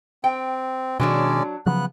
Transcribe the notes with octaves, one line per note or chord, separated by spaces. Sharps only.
C4 G5
B2 D#3 F#3 G#3 C#4 D4 C#5 D5
C#3 F3 F#3 B3 F#6